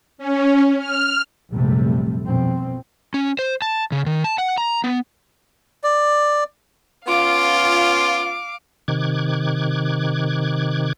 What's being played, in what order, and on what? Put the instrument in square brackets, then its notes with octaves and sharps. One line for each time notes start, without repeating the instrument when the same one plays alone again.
[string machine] C#4
F6
[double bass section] A#1 F#2 C3 G3 A3
F2 B2 C4
[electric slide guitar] C#4
C5
A5
C#3
D#3
A5
F#5
A#5
B3
[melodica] D5
[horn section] B3 C#4 F4 [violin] F5 D6
[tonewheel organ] C3 D#3 D6 F#6 G#6